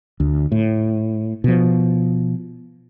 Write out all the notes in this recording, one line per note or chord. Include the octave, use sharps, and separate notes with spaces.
D2
A2
B2 F3